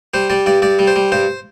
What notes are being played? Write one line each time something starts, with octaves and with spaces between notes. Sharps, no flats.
G3 C5
G3 D5
G2 D5
G2 D5
G3
C5
G3
G2 C5